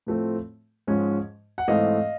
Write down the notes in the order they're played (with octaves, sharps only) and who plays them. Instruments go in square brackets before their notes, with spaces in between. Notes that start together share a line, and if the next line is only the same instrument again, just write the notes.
[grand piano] A2 F3 A3 C4
G#2 F3 G#3 C#4
F#5
G#2 E3 A3 C4 D#5 F5